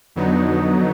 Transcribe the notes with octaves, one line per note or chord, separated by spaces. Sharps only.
F2 D3 F#3 B3 D#4